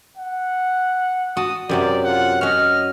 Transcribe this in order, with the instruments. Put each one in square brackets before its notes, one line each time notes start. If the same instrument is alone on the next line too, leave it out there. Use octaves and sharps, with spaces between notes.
[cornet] F#5
[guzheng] F#4 A5 [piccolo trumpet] D#6
[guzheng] F#2 C3 F#3 [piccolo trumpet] D5
[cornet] F4 [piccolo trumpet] F#5
[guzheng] C#4 F#4 [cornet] D#5 [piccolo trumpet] F6